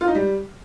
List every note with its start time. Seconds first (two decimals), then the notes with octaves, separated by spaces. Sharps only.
0.01 F4
0.08 D#4
0.15 G3